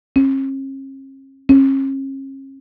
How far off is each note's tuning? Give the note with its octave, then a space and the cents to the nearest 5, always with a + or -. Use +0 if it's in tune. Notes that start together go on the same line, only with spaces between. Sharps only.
C#4 -45
C#4 -40